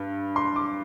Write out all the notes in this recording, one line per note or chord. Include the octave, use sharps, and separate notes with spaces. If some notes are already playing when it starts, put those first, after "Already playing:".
Already playing: G2
C6
D6